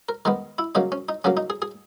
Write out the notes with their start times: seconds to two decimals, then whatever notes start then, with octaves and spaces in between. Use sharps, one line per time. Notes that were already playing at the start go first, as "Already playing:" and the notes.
0.09 A#4
0.25 D#3 G#3 B3 A#4
0.58 E4
0.75 C#3 F#3 A#3 D#4
0.92 C#4
1.09 D#4
1.24 C#3 F#3 A#3 C#4
1.37 D#4
1.50 G#4
1.62 G#4